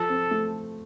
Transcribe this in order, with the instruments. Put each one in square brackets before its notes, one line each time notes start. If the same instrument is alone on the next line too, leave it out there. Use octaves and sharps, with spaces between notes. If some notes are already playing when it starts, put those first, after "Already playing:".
Already playing: [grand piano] F3 [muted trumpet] A4
[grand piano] C4
A3